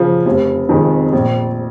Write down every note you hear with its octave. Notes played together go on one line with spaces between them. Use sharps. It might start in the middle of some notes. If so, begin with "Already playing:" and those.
Already playing: C#3 F3
F1
F2 C3 D#3 G#3
A#1